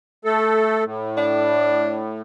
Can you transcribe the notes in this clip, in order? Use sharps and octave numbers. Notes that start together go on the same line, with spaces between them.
A3 A4
A2
D4